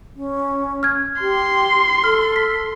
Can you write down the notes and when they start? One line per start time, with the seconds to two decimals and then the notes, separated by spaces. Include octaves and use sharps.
0.16 C#4
0.83 F6 G#6
1.21 G4 C6
2.04 A4 F6
2.36 B6